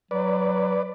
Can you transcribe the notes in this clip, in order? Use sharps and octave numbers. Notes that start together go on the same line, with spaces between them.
F#3 B4 D5